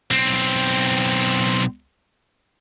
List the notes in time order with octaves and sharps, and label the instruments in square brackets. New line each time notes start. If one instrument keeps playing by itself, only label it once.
[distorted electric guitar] B1 C4